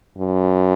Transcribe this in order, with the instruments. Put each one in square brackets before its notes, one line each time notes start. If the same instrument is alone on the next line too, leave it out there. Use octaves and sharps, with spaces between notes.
[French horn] F#2